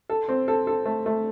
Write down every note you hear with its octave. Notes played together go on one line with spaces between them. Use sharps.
A4
C4
A4
A4
A3
A3